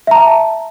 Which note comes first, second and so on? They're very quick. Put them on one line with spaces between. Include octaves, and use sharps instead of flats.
E5 A#5 A5